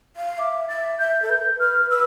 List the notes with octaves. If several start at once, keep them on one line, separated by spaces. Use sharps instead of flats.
F5
E5 D6
E5 A6
E5 G6
A4
B4 G6
B4 F6
B4 E6